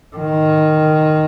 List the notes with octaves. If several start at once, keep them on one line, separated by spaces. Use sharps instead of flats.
D#3